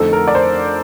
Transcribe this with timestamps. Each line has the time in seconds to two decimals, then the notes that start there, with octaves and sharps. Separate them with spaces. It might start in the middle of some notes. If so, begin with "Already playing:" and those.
Already playing: F2 D3 A3 C4 D#4 A4
0.13 A#4
0.27 D5
0.35 C5